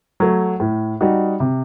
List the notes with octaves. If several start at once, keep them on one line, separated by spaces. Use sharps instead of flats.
F#3 A3
A2
G3 D#4 F#4
C3